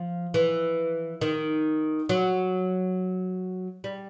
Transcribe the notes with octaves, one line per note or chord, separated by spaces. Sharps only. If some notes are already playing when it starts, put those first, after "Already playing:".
Already playing: F3
E3
D#3
F#3
G3